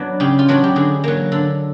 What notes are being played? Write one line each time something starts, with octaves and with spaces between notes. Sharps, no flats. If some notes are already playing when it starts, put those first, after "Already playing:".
Already playing: F#3 B3 D4
C#3 G4
F4
F#3 B3 D4 F#4
G4
D3 G#4
F#3 A#3
D3 A4